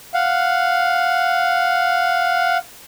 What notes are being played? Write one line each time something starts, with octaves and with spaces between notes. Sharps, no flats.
F5 F#5